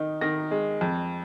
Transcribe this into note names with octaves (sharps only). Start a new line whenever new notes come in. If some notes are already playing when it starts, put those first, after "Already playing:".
Already playing: D#3 D#4
D#3 A#6
G#3
F2